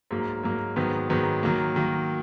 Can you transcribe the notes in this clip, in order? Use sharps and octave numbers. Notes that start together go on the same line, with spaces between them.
G#2 F#3 A#3
G#2 F#3 A#3
G#2 D#3 F#3 B3
G#2 D#3 F#3 B3
D#3 F#3 A#3
D#3 F#3 A#3